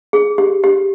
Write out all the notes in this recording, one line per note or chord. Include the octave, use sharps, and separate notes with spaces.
G#4
G4
G4